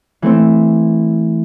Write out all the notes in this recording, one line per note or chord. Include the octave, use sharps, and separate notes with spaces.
E3 A3 C4